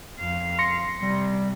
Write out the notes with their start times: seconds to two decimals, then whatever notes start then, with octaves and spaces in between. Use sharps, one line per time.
0.19 F2 F5
0.59 C6 A#6 C#7
1.00 C3 G3